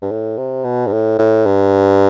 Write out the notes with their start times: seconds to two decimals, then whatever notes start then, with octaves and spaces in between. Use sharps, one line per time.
0.02 G2
0.11 A2
0.38 C3
0.64 B2
0.87 G2
0.93 A2
1.19 A2
1.46 G2